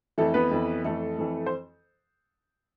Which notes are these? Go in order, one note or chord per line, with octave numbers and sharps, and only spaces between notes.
F2 E3 A3 A4
B3 B4
F2 E3
F2 E3 A3 A4
F2 E3
C5